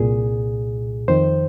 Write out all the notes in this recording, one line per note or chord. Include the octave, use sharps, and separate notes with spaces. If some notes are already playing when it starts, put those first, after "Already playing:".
Already playing: C2 A#2 G#4
F2 D#3 C5